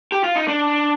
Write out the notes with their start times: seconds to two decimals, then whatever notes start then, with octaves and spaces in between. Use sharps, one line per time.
0.12 G4
0.24 F4
0.36 D#4
0.48 D4